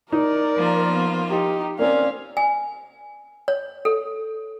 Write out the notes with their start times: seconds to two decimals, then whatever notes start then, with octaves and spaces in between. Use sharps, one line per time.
0.12 D#4 A#4 D5
0.56 F3 A#3 F4
0.90 B3
1.29 D#4 G4
1.79 A#3 C4 C#4 D5 F5
2.37 G#5
3.48 C#5
3.85 A4